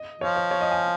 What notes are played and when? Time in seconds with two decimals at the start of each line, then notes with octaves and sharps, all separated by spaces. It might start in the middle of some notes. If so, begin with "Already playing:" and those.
Already playing: D#5
0.21 F3 C#5
0.36 C#5
0.51 C#5
0.61 D#5
0.71 G#5